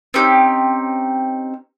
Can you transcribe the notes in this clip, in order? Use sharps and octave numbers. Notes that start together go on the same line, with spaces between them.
C4 C#4 D#4 G4